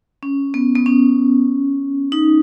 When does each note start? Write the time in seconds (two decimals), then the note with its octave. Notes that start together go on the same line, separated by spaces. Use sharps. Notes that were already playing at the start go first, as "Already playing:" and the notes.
0.23 C#4
0.54 B3
0.75 B3
0.86 C#4
2.12 D#4